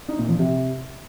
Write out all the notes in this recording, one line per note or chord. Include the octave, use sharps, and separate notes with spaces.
D#4
A#2
F3
C3